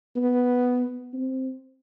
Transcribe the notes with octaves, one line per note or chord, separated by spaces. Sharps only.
B3
C4